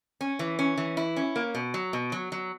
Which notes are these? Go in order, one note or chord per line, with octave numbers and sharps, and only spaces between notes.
C#4
E3
C#4
E3
E4
C#4
A#3
B2
F#3
B2
F#3
F#3